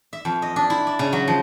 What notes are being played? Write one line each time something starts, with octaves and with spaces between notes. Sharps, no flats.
E5
F2
D#5
D4
E4
D5
C#3
F#3
F3